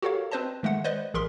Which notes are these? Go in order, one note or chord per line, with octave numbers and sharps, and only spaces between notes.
F#4 G4 A4 A#4 C#5 F5
C4 B4 C5 D#5 A5
D#3 G#3 A3 F#5
B4 C5 D5 D#5
A1 G#4 A#4 C6 B6